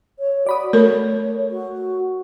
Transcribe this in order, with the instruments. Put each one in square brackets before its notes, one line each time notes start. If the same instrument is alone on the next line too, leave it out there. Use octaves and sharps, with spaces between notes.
[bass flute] C#5
[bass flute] F#4 [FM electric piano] D5 B5 D#6
[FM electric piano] A3 [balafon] A#4 [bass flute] C#5
[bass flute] F#4